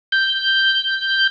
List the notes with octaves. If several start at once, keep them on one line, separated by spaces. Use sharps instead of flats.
G6